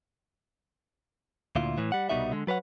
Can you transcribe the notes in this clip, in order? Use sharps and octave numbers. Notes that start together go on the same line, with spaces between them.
D2 A#2 E4 F4
A2 E3
G3 F#5
C2 B2 G3 D#4 F#4 E5
D3 G#3
F#3 B4 C#5 F#5